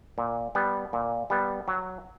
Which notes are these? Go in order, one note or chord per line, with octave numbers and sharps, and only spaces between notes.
A#2
G3 B3
A#2
G3 B3
F#3